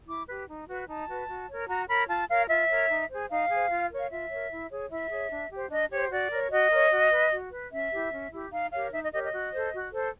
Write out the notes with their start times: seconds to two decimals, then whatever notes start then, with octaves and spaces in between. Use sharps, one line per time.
0.08 E4 D6
0.29 G4 B4
0.48 D#4
0.68 F#4 B4
0.88 D#4 A5
1.09 F#4 B4
1.29 F#4
1.49 A#4 C#5
1.69 F#4 A#5
1.89 A#4 C#5 B5
2.09 F4 A5
2.29 A#4 C#5 F5
2.49 F4 E5
2.69 A#4 C#5
2.90 D#4
3.10 G#4 C5
3.30 D#4 F5
3.50 G#4 C5
3.70 F4
3.90 A#4 C#5
3.99 F5
4.10 F4 E5
4.30 A#4 C#5
4.50 E4
4.70 G#4 C#5
4.90 E4 E5
5.11 G#4 C#5
5.30 D4
5.51 G4 C5
5.70 D4 D#5
5.91 G4 C5 C#5
6.11 F#4 D5
6.31 A#4 C#5
6.51 F#4 D#5
6.71 A#4 C#5
6.92 F#4
7.11 B4
7.32 F#4
7.51 B4
7.72 C#4 E5
7.92 E4 G4
8.12 C#4
8.32 E4 G4
8.52 D#4 F5
8.72 G4 A#4 C#5 F5
8.92 D#4 E5
9.02 D#5
9.12 G4 A#4 C#5 D#5
9.23 D#5
9.33 F#4
9.52 A4 C5
9.73 F#4
9.93 A4 C5